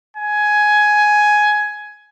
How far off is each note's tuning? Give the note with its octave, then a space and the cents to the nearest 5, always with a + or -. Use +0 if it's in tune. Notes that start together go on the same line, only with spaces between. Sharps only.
G#5 +10